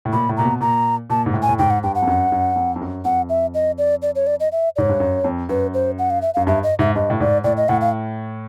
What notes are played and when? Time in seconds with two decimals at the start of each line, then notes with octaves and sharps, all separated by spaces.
0.05 A2
0.13 A#2 B5
0.29 A2
0.37 A#2 A#5
0.45 B2
0.61 A#2 A#5
1.10 A#2 A5
1.26 G#2
1.34 A2
1.42 G#5
1.49 A2
1.59 G#2 G5
1.70 F#5
1.83 G2 G5
1.95 F#5
2.02 F2
2.07 F#2
2.32 F#2
2.56 F2
2.76 F2
2.81 F#2
3.05 F2 F#5
3.29 E5
3.54 D#5
3.78 D5
4.02 D5
4.15 C#5
4.27 D5
4.40 D#5
4.52 E5
4.76 G#2 C#5 D5
4.89 G2
5.00 F#2
5.24 F2
5.49 F#2 B4
5.74 C5
5.99 F#5
6.10 F5
6.22 E5
6.34 F#2 F5
6.47 G2 E5
6.63 D#5
6.79 G#2 E5
6.95 G2 D#5
7.10 A2
7.20 G#2 D5
7.44 A2 D5
7.57 D#5
7.69 A2 F#5
7.81 F5